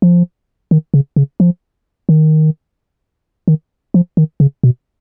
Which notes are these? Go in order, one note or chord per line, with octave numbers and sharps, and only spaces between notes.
F3
D#3
C#3
C#3
F3
D#3
D#3
F3
D#3
C#3
B2